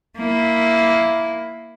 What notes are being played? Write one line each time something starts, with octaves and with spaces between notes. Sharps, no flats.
A#3 E4